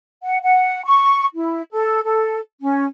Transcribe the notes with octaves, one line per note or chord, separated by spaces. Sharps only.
F#5
F#5
C#6
E4
A4
A4
C#4